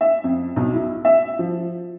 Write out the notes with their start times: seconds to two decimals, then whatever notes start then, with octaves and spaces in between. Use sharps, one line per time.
0.01 E5
0.24 F2
0.56 B1
0.74 E4
1.05 E5
1.39 F3